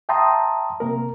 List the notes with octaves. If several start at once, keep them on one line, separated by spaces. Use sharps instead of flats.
E5 G5 A5 A#5 C6 D#6
C3 A#3 A#4